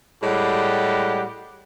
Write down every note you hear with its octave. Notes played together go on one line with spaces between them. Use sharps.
A2 G3 G#3 G4 F#5